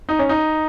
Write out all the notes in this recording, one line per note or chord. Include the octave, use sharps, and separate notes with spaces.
D#4
C#4
D#4